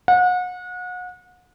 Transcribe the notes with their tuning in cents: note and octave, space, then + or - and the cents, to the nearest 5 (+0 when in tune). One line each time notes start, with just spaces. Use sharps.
F#5 -35